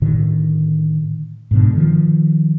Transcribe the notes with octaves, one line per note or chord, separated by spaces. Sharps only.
A2 D3 D#3
G#2 B2 D3
D#3 F3